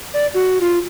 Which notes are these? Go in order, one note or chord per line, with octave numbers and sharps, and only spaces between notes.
D5
F#4
F4